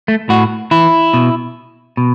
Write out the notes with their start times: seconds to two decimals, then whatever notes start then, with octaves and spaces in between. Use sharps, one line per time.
0.08 A3
0.29 A2 F#4
0.71 E3 E4
1.13 B2
1.97 B2